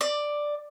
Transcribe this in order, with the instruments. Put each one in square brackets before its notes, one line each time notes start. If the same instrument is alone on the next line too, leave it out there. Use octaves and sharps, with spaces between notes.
[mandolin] D5